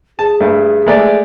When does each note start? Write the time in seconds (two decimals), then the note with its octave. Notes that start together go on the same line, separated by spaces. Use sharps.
0.19 G#4 A5
0.40 G2 A3
0.86 G#3 A3 D5